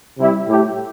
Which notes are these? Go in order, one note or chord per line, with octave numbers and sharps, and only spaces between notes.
C3 G3 E4
A2 A3 E4 G4